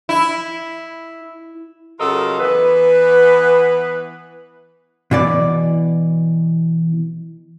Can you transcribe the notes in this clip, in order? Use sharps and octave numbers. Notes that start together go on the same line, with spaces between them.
E4
C#3 F#3 F4 A4 A#4 D#5
E3 B3 B4
B2 E3 D5